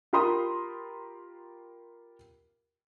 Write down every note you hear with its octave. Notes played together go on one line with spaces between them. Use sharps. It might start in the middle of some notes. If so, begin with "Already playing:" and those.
F4 G4 A#4 B5 C6 D#6